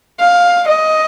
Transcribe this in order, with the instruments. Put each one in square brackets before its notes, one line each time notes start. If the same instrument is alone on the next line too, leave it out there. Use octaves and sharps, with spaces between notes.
[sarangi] F5
D#5